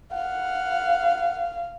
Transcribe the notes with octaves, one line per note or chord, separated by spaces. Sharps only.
F5 F#5